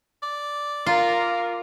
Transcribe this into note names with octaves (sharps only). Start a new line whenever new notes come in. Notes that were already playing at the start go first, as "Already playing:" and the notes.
D5
F4 A#4 F5 A#5 C7